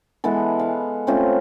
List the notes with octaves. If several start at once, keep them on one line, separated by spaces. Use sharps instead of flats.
E3 G#3 B3 A4
F5
A3 C4 C#4 F4